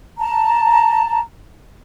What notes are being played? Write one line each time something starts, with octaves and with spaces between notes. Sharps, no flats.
A5 A#5